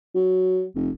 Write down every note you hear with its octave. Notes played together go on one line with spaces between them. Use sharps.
F#3
F1